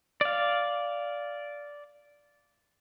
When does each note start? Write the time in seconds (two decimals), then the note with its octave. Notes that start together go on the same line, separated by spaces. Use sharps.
0.21 D5 F5